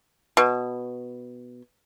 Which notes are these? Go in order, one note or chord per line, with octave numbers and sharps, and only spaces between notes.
B2